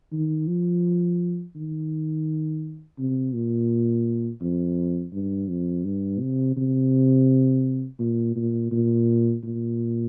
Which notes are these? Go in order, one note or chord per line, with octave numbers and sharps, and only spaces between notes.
D#3
F3
D#3
C3
A#2
F2
G2
F2
G2
C3
C3
A#2
A#2
A#2
A#2